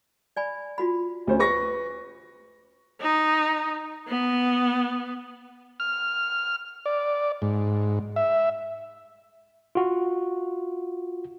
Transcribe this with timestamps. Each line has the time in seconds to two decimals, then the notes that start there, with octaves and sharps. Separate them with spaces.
0.37 D5 G#5 B5
0.78 F4 F#4 B5
1.27 D2 C#4 C5
1.39 B4 C#6 A#6
3.01 D#4
4.08 B3
5.80 F6
6.86 D5
7.42 G#2
8.16 E5
9.75 F4 F#4